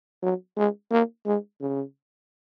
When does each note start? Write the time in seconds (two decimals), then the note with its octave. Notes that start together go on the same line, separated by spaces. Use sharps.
0.23 F#3
0.57 G#3
0.91 A#3
1.26 G#3
1.61 C#3